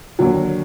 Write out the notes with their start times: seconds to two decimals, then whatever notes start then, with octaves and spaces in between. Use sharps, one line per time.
0.19 D#2 D3 F#3